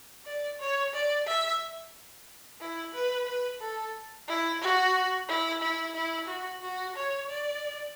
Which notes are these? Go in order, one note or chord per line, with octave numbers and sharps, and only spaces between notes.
D5
C#5
D5
E5
E4
B4
B4
A4
E4
F#4
E4
E4
E4
F#4
F#4
C#5
D5